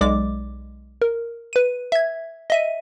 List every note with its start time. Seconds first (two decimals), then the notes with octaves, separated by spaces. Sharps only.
0.01 B1 G#3 D5 D6
1.02 A#4
1.53 B4 D#7
1.92 E5 G#6
2.50 D#5 E5 D#7